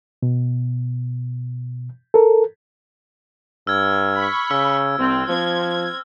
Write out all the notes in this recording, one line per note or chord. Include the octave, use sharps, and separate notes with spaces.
B2
A4 A#4
G2 E6 F6 G#6
B5 C#6
C#3 E6
C2 C4
F3 C4 G#6